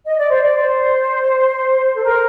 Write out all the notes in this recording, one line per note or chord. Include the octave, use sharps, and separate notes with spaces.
D#5
D5
C5
D5
C5
A4
A#4